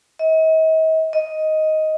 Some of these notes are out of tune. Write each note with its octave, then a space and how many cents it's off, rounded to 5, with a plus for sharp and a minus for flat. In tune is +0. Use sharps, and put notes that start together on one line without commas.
D#5 +45
D#5 +10